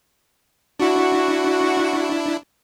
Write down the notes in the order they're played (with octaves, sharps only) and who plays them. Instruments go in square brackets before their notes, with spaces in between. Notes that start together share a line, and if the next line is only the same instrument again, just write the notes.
[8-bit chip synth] D4 E4 [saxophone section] F#4